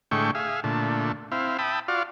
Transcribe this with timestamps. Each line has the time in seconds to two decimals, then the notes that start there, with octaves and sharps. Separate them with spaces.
0.11 A2 D3 G#3 A3 G5 C#6
0.35 G#4 E5 F5
0.64 A#2 D3 A3
1.32 C4 E4 F5
1.59 E5 G5 A5 B5 D#6
1.88 F4 F#4 D5 F5